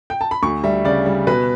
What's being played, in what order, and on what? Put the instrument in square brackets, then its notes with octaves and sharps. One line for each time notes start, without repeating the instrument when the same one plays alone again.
[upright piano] G5
A5
B5
D2 C#6
G3 E5
C#3 D5
G3
B2 B4